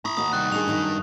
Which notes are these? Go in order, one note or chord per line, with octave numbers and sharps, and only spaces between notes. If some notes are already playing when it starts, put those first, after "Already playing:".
E4 A#5 B5 C#6 D#6
D#2 D#3 F#4 D#6
C2 G3 F#6
D#3 G3 D4 G#4 F7
F#2 D#3 D#4